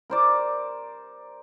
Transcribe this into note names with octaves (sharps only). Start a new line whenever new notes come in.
A#4 C5 D5